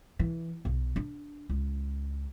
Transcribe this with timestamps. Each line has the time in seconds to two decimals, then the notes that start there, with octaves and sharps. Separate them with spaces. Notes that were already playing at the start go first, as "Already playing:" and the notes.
0.19 E3
0.65 B1
0.96 D4
1.49 C#2